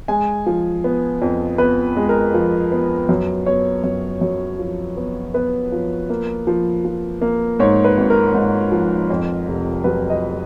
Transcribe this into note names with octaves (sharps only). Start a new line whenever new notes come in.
G#3 G#5
F3
B3
F2
B3 B4
G#3
A#4
F3
B3
F#2
B3 C#5
F#2
F#2
F3
B3
B3 B4
F3
A#3
F3
F3
A#3
G#2 C#5
B4
G#1
A#4
G#2
F3
F2
F1
F#3 B4
D#5